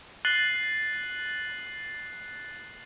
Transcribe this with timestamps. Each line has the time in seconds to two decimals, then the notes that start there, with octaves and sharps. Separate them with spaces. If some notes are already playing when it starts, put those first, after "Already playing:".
0.25 F#6 A6 C7 D#7 F#7 G7